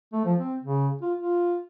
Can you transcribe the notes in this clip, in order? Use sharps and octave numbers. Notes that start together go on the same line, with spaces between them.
A3
F3
C4
C#3
F4
F4